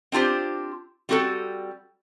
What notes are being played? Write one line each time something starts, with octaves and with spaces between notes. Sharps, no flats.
C4 D4 F4 G4 C5
G3 C4 F#4 G#4 A4